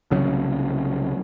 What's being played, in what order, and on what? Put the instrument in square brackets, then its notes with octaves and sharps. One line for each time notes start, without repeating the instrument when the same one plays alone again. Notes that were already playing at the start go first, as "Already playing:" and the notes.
[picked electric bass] C2 C#3 F#3